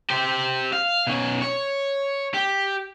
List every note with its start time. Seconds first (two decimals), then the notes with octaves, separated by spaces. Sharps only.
0.10 G4 C5
0.73 F5
1.07 B2 C#4
1.42 C#5
2.34 G4